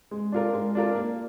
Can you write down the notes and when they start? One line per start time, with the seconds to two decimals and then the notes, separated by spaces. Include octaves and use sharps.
0.11 G#3
0.32 D4 F4 A#4
0.53 G#3
0.75 D4 F4 A#4
0.95 A#3